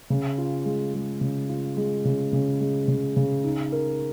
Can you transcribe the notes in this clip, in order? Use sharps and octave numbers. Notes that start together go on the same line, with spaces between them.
C#3
F4
G#3
G#3
C#3
F4
G#3
C#3
C#3
G#3
C#3
C#3
D#4
A#4